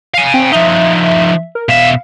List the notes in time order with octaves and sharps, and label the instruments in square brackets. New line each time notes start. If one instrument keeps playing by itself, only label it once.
[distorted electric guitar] F5 G#5
[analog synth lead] C4
[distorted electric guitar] F3 D#4 [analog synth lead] E5
[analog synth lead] A#4
[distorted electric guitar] B2 E5 [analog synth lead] F5